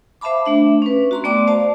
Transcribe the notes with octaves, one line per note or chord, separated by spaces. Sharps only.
C5 E5 F5 A5 B5 D6
A3 D4 E5
C#4 B4
F#4 A#5 C6
A3 B3 D5 G5 D6
C5 D5 F5 A5